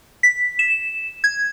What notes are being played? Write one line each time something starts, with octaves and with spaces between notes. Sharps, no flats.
B6
E7
G#6